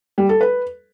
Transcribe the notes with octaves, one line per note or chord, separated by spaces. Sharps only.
G3
A4
B4